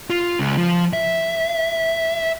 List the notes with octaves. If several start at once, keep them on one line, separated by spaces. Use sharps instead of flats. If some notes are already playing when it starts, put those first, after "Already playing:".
F4
C#2
F3
E5